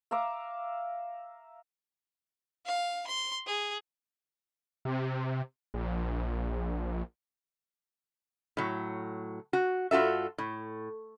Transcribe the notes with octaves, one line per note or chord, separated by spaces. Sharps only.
E5 F5 A#5 D6
F5
C6
G#4
C3
A#1
A2 F#3
F#4
G2 F4 F#4 A4 E5
A2